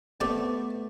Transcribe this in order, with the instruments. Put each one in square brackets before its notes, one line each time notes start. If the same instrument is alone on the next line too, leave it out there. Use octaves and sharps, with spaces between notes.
[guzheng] A3 [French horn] B3 [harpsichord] C4 G4 D5